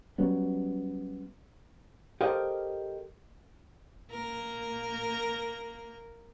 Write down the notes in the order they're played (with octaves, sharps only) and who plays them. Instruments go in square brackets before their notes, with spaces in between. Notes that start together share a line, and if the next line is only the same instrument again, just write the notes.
[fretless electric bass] F#3 G3 B3 C#4
[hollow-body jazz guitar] G4 A4 A#4 C5 D#5 F5
[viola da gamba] A#3 A#4